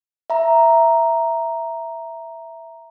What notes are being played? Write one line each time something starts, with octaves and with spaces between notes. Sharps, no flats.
E5 A#5